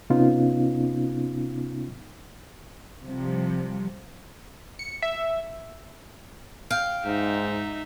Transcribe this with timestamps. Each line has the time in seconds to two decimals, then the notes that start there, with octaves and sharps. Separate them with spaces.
0.10 C3 B3 C#4 D#4 F4
3.06 C3 F3 G3
4.79 C#7
5.03 E5
6.71 F5 G5
7.06 G#2 D#4 E5